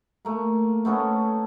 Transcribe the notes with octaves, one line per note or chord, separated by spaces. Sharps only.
A3 A#3
A3 B3 C#4 A4